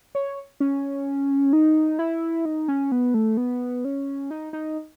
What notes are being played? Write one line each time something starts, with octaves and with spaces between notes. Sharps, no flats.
C#5
C#4
D#4
E4
D#4
C#4
B3
A3
B3
C#4
D#4
D#4